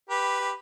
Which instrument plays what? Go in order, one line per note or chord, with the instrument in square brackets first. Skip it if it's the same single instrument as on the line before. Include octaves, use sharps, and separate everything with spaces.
[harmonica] G4 B4
G4